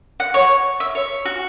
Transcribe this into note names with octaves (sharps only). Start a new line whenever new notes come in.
F#5
C#5
E5
C#5
F#4